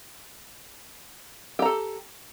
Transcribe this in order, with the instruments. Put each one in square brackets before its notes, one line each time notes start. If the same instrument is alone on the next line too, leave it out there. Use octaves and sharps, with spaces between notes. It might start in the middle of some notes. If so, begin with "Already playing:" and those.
[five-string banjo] G4
A#5
A4